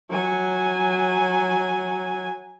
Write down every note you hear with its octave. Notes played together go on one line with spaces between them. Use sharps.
F#3 G#5